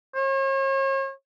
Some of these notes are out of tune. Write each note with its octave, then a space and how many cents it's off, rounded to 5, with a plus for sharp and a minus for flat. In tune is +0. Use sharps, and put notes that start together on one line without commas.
C#5 -40